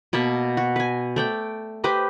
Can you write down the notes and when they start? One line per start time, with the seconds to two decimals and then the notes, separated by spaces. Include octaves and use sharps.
0.13 B2 A#3 A5 B5
0.57 F#4
0.76 B4 G#5
1.16 A3 D5 G5
1.84 G4 B4 C5 D#5